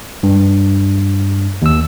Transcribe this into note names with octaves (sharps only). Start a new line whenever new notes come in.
G2
D#2 E6